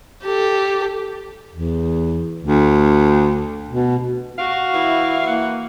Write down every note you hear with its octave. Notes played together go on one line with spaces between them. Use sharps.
G4 A4
E2
D2
B2
F#4 F5
E3 E4
A#3 F#5